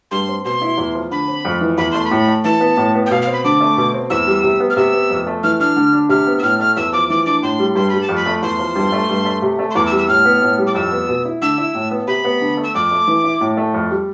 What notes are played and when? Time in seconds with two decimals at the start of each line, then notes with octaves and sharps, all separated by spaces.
0.11 G2 C6
0.28 C4
0.45 B2 C6
0.62 E4
0.78 E2
0.95 F3
1.11 D3 B5
1.28 C4
1.45 F2
1.61 E3
1.78 E2 B5
1.91 A3 C6
2.05 B5
2.11 A2
2.27 A3
2.44 E3 A5
2.60 B3
2.77 A2
2.95 B3
3.06 G5
3.10 B2 F5
3.22 F5
3.27 C4
3.33 B5
3.44 D3 D6
3.61 A3
3.77 B2
3.94 C4
4.10 E2 E6
4.27 G3
4.43 C3
4.60 B3
4.70 F6
4.77 C3 E6
4.93 B3
5.10 F2
5.26 A3
5.43 E3 F6
5.60 D4 F6
5.76 D3
5.93 D4
6.09 C3 F6
6.26 B3
6.39 E6
6.43 A2 F6
6.59 A3 F6
6.76 E2 E6
6.93 F3 D6
7.09 E3 D6
7.26 D4 D6
7.43 A2 C6
7.59 G3
7.75 G2 C6
7.89 G3 B5
8.02 A5
8.09 F2
8.16 B5
8.26 A3
8.42 E2 C6
8.59 F3
8.75 G2
8.92 A3
9.09 G2
9.25 A3
9.42 C3
9.59 A3
9.71 C6
9.75 E2 D6
9.86 E6
9.92 G3
9.97 E6
10.08 A2 F6
10.25 B3
10.42 A2
10.58 G3
10.67 D6
10.74 F2 E6
10.92 B3
11.09 B2
11.25 E4
11.42 D3 E6
11.58 E4
11.75 A2
11.91 B3
12.07 C3 B5
12.24 B3
12.41 D3
12.57 A3
12.64 E6
12.75 F2 D6
12.91 A3
13.07 E3
13.24 E4
13.41 A2
13.57 A3
13.74 F2
13.91 G3